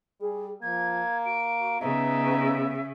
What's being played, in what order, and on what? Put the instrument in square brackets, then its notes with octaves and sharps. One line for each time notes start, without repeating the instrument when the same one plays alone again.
[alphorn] G3 [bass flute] G#4
[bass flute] F3 [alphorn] A#3 [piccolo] G#6
[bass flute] F#4 [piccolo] D7
[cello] C#3 [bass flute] B3 [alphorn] D#4 [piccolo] E5